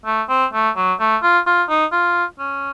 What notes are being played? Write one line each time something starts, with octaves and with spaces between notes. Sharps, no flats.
A3
C4
A3
F#3
A3
F4
F4
D#4
F4
C#4